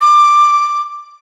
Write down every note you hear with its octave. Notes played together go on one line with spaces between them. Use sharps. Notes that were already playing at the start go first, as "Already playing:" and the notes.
D6